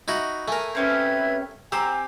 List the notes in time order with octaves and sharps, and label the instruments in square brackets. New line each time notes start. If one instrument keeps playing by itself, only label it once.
[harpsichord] D#4 E4 F#4
[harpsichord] A3 A#4 [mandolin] G#5
[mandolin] C4 C#4 G4 [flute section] B4 E5 G#6
[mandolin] C4 A#5 E6 [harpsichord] G4 [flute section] G#5